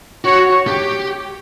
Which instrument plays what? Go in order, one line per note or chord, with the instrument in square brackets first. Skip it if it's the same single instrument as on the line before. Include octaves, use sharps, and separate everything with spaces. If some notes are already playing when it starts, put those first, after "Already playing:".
[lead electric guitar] F#4 [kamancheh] C#5
[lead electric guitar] G4